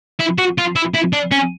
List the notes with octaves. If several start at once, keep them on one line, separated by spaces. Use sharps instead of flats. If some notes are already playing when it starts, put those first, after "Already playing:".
E4
F#4
F4
E4
E4
D4
C#4